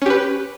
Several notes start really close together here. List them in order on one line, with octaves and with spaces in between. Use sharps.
C#4 G4 B4